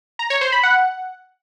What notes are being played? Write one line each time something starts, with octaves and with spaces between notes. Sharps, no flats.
A#5
C#5
C5
B5
F#5